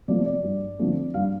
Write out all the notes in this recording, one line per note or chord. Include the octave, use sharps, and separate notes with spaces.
C3 F3 A3 D5
D5
G2
D3 F3 A3 C4
G2 F5